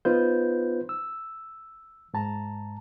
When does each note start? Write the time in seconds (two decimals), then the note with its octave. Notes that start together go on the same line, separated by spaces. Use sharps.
0.05 B3 D#4 F4 B4 C5 G6
0.89 E6
2.14 G#2 A5 A#5